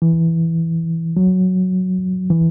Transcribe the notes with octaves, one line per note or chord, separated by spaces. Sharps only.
E3
F#3
E3